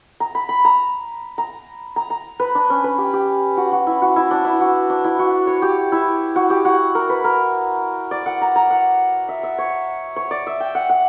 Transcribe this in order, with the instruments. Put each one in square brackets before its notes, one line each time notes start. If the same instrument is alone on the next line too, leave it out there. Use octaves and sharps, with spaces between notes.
[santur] A#5
B5
B5
A#5
A#5
A#5
A#5
B4
D4
C#4
B4
G4
G4
F#4
F#4
E4
F#4
E4
D4
E4
F#4
D4
E4
F#4
C#5
G4
E4
F#4
G4
F#4
A#4
B4
A#4
D5
F#5
A#5
A#5
F#5
E5
E5
C#5
C#5
D5
E5
G5
F#5
F#5